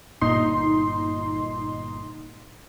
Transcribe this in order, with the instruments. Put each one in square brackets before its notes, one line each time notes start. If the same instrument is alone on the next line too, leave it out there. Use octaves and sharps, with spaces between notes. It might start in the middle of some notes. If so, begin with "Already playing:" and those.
[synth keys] G1 A#2 D#4 C6